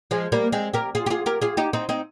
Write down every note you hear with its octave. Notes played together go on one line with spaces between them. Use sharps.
F3 G#3
G3 A#3
G#3 C4
G4 A#4
F4 G#4
G4
F4 G#4
G4 A#4
F4 G#4
D#4 G4
C4 D#4
C4 D#4